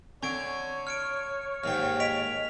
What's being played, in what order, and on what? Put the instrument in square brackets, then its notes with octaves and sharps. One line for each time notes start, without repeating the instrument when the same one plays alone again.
[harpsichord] D3 [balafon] C4 [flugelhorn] C#5 [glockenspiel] C#6 G#6 D7
[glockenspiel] F6 C#7 D7
[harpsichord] D#2 G#2 G5 [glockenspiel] F6
[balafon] D#5 [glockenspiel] B6 D7 F7